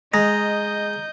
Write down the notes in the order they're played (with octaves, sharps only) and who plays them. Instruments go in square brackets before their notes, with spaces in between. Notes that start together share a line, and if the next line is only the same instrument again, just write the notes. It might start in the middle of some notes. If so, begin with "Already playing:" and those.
[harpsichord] G#3 [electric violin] D#5 G6 [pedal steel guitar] A#5